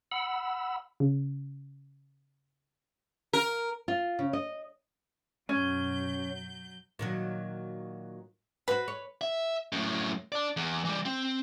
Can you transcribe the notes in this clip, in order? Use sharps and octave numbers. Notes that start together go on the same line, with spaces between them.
F#5 B5 E6
C#3
A#4
F4
C#3
D#5
F#2 B2 F#3 C#4 G6
A#2 D#3 F#3
F#4 B4 C5
C#5
E5
F#2 A2
D5 A5
E2
E3 G3
C4